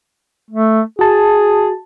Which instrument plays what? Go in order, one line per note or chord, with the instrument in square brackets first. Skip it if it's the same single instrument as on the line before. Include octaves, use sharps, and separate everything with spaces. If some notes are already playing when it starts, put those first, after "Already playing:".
[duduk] A3
[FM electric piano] F#4 A5 [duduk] G#4